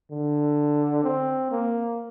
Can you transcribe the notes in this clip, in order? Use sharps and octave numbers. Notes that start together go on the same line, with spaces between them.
D3
C4
A#3